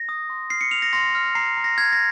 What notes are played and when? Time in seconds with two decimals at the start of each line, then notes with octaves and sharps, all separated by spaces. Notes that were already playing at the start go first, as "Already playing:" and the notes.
Already playing: A#6
0.09 D#6
0.30 C6
0.50 F6 C7
0.61 C#7
0.71 F6 F7
0.82 A#6
0.93 C6 A#6
1.15 F6
1.35 A#5 C7
1.57 A#5
1.64 A#6
1.77 F6 G#6
1.93 A#6